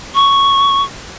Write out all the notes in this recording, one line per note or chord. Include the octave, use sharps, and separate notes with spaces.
C#6